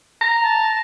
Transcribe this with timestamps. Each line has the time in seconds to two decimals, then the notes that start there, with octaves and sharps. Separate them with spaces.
0.21 A#5 A#6
0.42 A5